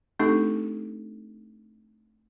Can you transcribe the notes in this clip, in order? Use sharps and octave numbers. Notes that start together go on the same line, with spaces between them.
A3 C4 D4 D#4 G4 A4